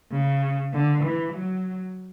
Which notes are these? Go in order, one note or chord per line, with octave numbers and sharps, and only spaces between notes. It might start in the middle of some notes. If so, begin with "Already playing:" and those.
C#3
D3
E3
F#3